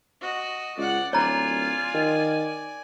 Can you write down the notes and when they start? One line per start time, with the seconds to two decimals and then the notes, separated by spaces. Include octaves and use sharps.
0.21 F#4 D#5
0.77 C#2 D5 F#5
1.13 D1 F4 C#5 D5 G#5 A#5
1.94 D#3